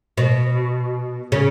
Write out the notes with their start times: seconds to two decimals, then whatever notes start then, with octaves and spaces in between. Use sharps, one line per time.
0.17 B2
1.32 C#3